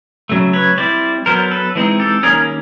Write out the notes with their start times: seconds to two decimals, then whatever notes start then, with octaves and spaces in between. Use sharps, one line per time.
0.29 C#3 F#3 A3
0.53 B4 C#5
0.78 G3 C4 E4 C5 D5
1.26 F#3 B3 D4 A#4 C5
1.51 A4 B4
1.75 E3 G#3 C4 D#4
2.00 G4 A4
2.23 D#3 G3 A#3 C#4 G#4 A#4